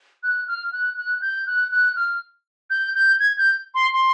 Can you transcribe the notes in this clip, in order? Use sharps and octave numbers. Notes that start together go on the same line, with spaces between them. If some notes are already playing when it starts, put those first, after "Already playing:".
F#6
F6
F#6
F#6
G6
F#6
F#6
F6
G6
G6
G#6
G6
C6
C6